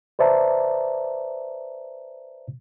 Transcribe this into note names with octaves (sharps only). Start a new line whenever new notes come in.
B4 C5 D5 E5 A5 A#5